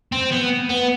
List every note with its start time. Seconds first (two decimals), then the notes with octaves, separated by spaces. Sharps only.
0.12 C4
0.32 B3
0.69 B3